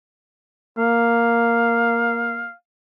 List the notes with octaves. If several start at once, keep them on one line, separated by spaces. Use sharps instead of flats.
A#3 F5